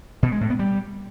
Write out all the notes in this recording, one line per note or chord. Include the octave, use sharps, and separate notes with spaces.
B2
G#3
A2
B3
G3